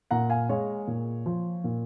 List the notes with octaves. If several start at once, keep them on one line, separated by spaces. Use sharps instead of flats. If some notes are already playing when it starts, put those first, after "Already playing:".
A#2 F#5 A#5
F5 G#5
G#3 C#5 F5
A#2
F3
A#2